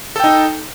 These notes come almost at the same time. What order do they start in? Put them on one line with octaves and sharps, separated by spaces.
A4 G5 D#4